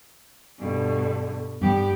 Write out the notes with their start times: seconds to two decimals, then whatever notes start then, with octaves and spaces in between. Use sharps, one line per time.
0.58 G2 B2 D3
1.61 G2 G3 B3 G4